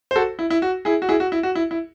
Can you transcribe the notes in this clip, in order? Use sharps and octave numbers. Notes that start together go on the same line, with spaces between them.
C5
F#4 A4
E4
E4
F#4
E4 G#4
F#4
E4 G#4
F#4
E4
F#4
E4
E4